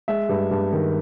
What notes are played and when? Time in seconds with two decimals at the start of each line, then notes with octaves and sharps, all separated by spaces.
0.08 G#3 E5
0.29 G2
0.51 G2
0.73 D#3